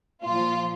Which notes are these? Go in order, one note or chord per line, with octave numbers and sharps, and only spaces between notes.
A#2 F3 F4